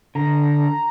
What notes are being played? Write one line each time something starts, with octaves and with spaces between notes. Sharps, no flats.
D3 A#5